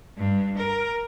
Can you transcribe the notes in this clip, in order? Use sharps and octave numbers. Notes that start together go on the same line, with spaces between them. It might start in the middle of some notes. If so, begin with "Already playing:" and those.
G2
A#4